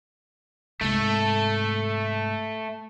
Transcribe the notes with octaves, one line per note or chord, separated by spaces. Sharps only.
G#2 C3 A3